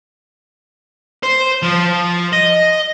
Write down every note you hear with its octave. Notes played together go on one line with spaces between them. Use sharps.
C5
F3
D#5